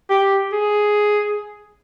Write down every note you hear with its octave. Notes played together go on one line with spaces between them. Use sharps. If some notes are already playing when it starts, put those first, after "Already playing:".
G4
G#4